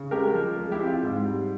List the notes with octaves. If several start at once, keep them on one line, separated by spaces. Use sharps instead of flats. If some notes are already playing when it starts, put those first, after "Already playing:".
Already playing: C#3
G#3 G4 A#4
F3
G#3
E4 G4
C4
F4
G#2
G3